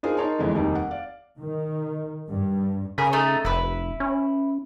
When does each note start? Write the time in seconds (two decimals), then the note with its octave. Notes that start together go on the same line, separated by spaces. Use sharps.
0.03 D4 D#4 F4 G#4 A#4 C5
0.17 D#4 A#4 C#5 A5 C6
0.39 F2 D3 E3 G#3
0.54 F1 D#2 G3 D#4
0.75 F#5
0.91 D5 F5
1.38 D#3
2.29 G2
2.98 C#3 G#4 A#4 B5
3.13 A3 D#4 A5
3.45 F1 E4 B4
4.00 C#4